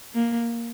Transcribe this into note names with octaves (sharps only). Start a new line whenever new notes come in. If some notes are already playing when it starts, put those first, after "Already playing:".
A#3